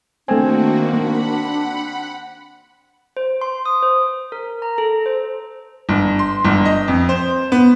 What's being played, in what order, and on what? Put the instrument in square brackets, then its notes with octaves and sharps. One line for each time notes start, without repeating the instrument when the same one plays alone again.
[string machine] D#3 A#3 F#4 [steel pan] A3 G#5 [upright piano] C4 [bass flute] D4
[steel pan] A#3 [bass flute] D4 [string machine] F#5 B5
[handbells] C5
C6
D#6
C5
A#4
A#5
A4
C5
[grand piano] G1
C6
G1
D#5
F2
C5
B3